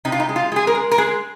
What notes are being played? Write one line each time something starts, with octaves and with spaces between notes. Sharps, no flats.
C3 D#4
F4
D#4
G#3
F4
G#3 G#4
A#4
G#3
A#4
G#3 G#4